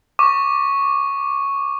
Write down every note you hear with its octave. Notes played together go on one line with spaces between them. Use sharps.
C#6 D6